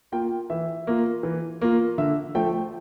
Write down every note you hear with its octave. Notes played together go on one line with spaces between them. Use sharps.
A#3 F4 G5
E3 E5
A#3 F4
E3
A#3 F4
D3 E5
F3 A3 G5